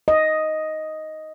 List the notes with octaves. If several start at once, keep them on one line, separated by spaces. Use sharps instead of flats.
D#5